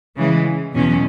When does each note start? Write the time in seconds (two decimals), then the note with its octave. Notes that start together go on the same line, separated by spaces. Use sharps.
0.16 C#3 E3 G#3
0.74 E2 B2 F#3 C#4